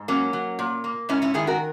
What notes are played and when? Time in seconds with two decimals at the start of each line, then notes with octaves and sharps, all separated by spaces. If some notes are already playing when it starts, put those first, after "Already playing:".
Already playing: G#2
0.08 F#3 A#3 C#4
0.33 F#3
0.59 A#2
0.84 A#3
1.09 G#2 C#4 E4
1.22 C#4 E4
1.34 D#3 E4 G#4
1.47 F#4 A#4